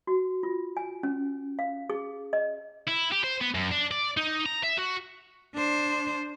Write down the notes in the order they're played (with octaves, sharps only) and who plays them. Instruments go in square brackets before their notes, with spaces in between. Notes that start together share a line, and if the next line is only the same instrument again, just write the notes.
[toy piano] F#4
F4
G#5
C#4
F5
G#4
D#5
[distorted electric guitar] E4
G4
C5
B3
F#2
D4
D5
D#4
A#5
E5
F#4
[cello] D4 C5